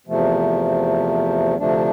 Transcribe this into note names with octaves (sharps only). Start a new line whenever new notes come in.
E2 C3 F3 A3
D2 C3 F3 A3 D4